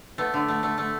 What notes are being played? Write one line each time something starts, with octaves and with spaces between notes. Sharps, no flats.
A3 B3
D3
A3
A3
A3